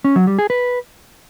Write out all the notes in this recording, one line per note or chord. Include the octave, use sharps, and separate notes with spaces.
C#4
F#3
G3
G#4
B4